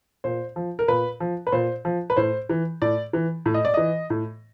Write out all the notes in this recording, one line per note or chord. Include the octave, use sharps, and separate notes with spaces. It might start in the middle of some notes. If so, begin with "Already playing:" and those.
A#2 C5
F3
A#4
A#2 B4
F3
B4
A#2 C5
F3
B4
A2 C5
E3
A2 D5
E3
A2
D#5
D5
E3 D#5
A2